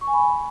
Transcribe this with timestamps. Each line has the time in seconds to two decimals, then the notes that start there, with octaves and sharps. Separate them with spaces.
0.01 C#6
0.07 G#5
0.13 B5